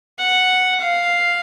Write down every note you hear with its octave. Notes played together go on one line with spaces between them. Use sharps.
F#5
F5